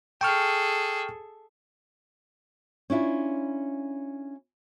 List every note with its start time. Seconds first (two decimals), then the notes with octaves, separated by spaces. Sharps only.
0.21 G#4 A4 G5 C#6 F6
2.90 C#4 D4 E4 F4